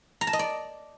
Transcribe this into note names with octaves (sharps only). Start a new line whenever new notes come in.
A#5
A5
D#5
D5